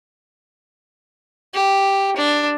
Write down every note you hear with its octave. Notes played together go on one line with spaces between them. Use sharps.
G4
D4